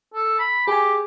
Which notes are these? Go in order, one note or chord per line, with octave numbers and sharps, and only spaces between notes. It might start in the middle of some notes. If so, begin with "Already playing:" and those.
A4
B5
G4 G#4 G#5